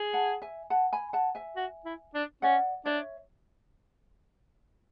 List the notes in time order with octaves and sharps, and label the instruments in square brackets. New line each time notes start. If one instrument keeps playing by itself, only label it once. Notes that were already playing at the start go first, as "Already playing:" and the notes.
Already playing: [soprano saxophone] G#4
[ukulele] F#5 A5
E5 G#5
F#5 A5
G#5 B5
F#5 A5
E5 G#5
[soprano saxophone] F#4
E4
D4
[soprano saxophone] C#4 [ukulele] D5 F#5
[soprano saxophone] D4 [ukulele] C#5 E5